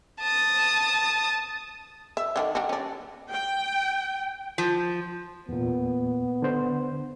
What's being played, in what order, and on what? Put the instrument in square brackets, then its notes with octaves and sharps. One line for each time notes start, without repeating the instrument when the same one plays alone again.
[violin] A5 D#6
[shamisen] E5
D3 D#3 D4
G3 D4 F#4
C#4 D4
[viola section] G5
[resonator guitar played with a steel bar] F3
[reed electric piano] E2 A#2 [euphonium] B3
[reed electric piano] D3 C5